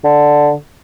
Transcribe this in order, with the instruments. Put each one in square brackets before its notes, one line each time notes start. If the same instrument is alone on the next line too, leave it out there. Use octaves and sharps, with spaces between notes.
[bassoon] D3